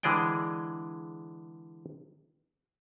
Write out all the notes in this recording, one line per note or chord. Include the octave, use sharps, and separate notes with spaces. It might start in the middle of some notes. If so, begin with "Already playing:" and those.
D3 E3 G#3 G#4 D5 G5